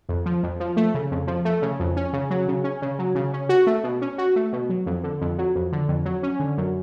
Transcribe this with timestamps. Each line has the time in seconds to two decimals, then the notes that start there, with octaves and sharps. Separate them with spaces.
0.09 F2
0.26 F3
0.43 F2
0.60 F3
0.77 A3
0.94 C#3
1.11 F2
1.27 F3
1.45 A3
1.62 C#3
1.80 F2
1.97 C#4
2.13 C#3
2.30 F#3
2.48 C#3
2.64 C#4
2.82 C#3
2.99 F#3
3.15 C#3
3.33 C#4
3.49 F#4
3.67 A3
3.84 B2
4.02 C#4
4.18 F#4
4.36 A3
4.53 B2
4.70 F#3
4.86 F2
5.04 D3
5.21 F2
5.38 F#3
5.55 F2
5.72 D3
5.88 F2
6.05 F#3
6.23 C#4
6.40 D3
6.58 F#2